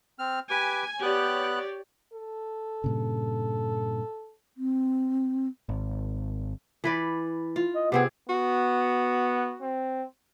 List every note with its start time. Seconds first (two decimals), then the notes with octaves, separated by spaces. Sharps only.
0.19 C4 F6
0.50 G4 B4 G#5 D6
1.02 B3 G4 C#5 D5 F#6
2.13 A4
2.84 G2 A#2 C#3
4.57 C4
5.69 G#1
6.84 E3 B4 D5
7.56 F4
7.75 D#5
7.92 C3 B3 C4 G#4
8.29 B3 F#4
9.62 C4